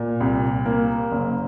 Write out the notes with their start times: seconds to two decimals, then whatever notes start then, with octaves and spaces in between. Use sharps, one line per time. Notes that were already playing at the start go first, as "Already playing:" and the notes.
Already playing: A#2
0.20 C2
0.65 A#3
1.11 F#1